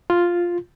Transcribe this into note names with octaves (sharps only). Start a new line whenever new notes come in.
F4